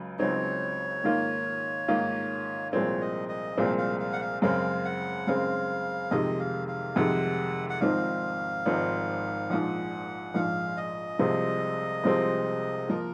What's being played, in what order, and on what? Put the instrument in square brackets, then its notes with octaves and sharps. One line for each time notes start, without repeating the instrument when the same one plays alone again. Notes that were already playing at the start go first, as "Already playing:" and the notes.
Already playing: [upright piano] C#2 C#3 F#3
[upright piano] C#2 C#3 F#3 C4 D#4 [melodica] C#5
[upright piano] G#2 D#3 A#3 F4
G#2 D#3 A#3 F4
[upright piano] C2 A#2 F3 G#3 C4 [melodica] C#5
[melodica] D#5
D#5
[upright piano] C2 A#2 F3 G#3 C4 [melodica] F5
[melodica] F5
F5
F#5
F5
[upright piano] F#2 C#3 G#3 C4 [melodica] F5
[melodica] F#5
[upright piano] F#2 C#3 G#3 C4 [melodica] F5
[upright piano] F2 C3 D#3 G#3 [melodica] D#5
[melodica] F5
F5
[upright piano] F2 C3 D#3 G#3 [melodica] F#5
[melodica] F#5
[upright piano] G#1 G#2 F3 C4 D#4 [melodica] F5
[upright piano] G#1 G#2 F3 C4 D#4
[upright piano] A#1 G#2 F3 [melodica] F#5
[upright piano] A#1 G#2 F3 [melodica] F5
[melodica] D#5
[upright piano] C2 C3 F3 G#3 C4
C2 C3 F3 G#3 C4
[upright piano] F3 A#3 F4 [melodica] A#4